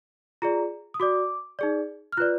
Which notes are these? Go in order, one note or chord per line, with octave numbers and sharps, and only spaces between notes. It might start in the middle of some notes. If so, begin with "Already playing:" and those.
F4 G#4 D5 A#5
D#6
F#4 D5 D6
D#4 G#4 D5
F6
F4 B4 D5 F#6